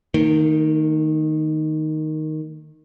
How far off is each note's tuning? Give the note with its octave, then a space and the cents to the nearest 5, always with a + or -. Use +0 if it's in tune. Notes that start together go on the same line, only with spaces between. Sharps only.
D#3 +0 A#3 -45